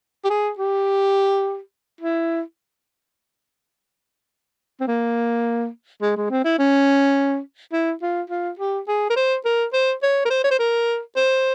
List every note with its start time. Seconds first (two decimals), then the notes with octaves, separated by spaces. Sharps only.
0.24 G4
0.30 G#4
0.58 G4
2.01 E4
4.80 C4
4.87 A#3
6.01 G#3
6.16 G#3
6.30 C4
6.44 E4
6.59 C#4
7.73 E4
8.02 F4
8.30 F4
8.59 G4
8.88 G#4
9.10 A#4
9.16 C5
9.45 A#4
9.73 C5
10.02 C#5
10.25 A#4
10.30 C5
10.44 C#5
10.51 C5
10.59 A#4
11.16 C5